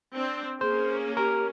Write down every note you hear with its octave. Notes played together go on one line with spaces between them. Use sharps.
C4 D4
A#3 C#4 G#4 C5
G4 A#4